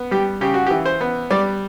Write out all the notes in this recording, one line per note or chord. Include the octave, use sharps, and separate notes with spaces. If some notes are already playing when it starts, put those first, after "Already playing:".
Already playing: B3
G3 G4
C#3 G4
F#4
G4
E3
C5
B3
G3 D5